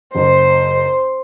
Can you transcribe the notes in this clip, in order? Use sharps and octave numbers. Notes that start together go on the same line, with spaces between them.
F#1 C5